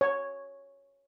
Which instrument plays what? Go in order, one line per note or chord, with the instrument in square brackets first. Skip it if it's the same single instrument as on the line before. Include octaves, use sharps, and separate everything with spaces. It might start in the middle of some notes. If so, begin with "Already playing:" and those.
[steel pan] C#5